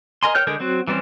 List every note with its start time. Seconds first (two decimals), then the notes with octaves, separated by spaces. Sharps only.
0.23 A#4 D#5 G#5 C6
0.35 A#4 C#5 G5 F6 G6
0.47 D3 G#3 A#4 G6
0.60 F#3 C4 F#4
0.87 E3 G3 C4 C#4